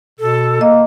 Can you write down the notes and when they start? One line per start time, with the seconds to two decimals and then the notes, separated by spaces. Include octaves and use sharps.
0.20 B2 A4
0.61 A#3 D#5